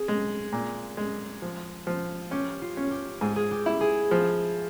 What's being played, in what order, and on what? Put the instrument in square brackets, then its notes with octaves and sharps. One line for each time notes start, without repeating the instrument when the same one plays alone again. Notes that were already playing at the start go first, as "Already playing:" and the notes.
Already playing: [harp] C4 G#4
[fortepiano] G#3
A#2
G#3
F3
F3
[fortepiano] C#4 [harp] G4
[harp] F4
[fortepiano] C#4
[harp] G4
[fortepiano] G#2 [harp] G#4
[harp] G#4
G4
[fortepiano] E4
[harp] G#4
[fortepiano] F3